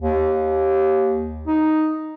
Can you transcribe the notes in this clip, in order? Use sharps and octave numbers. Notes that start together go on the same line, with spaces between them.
D#2
D#4